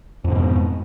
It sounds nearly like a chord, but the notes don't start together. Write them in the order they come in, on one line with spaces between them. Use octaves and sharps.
F2 G#2 D3 B2